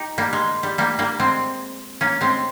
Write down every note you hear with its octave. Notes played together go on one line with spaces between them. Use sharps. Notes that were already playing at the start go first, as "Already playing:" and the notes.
Already playing: D#4 G4
G3 A#3
G#3
G3
G3 A#3
G3 A#3
G#3 C4
A#3 C#4
G#3 C4